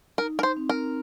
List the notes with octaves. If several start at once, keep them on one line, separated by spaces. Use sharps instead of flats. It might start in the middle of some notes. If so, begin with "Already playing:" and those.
D#4 A#4
A#4
C5
C4
A#4